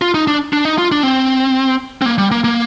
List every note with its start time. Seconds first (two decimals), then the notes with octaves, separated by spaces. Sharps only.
0.02 F4
0.14 D#4
0.27 D4
0.53 D4
0.65 D#4
0.78 F4
0.92 D4
1.03 C4
2.02 C4
2.06 A#3
2.18 G3
2.31 A#3
2.44 A#3